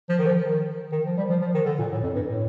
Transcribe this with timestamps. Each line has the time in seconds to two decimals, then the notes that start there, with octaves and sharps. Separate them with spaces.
0.09 F3
0.19 D#3
0.26 F3
0.43 D#3
0.92 D#3
1.05 F3
1.17 G3
1.29 F3
1.42 F3
1.54 D#3
1.66 D3
1.79 A#2
1.92 A2
2.03 F2
2.15 G2
2.28 A2